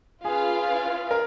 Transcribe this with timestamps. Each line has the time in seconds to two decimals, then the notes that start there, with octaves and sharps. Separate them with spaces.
0.25 C#4 F4 G#4 B4 F5
1.11 A#4